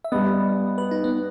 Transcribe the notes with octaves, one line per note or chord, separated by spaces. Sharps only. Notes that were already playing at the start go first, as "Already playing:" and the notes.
E5
G2 G3 B3 D#5
B4
D#4
B3